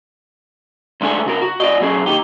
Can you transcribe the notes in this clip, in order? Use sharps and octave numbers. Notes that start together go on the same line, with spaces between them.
D2 G#3 D4 A4 G#5
C#3 F#4 A#4
F#4
F#4 D5 D#5
B2 F#3 C#4 G#4
D#2 D#4 G4